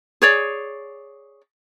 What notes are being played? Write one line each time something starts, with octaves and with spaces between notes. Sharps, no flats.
G#4 C#5 D5